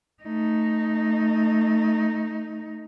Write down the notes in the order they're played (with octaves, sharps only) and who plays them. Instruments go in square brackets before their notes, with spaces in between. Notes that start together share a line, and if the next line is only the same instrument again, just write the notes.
[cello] A3 D#4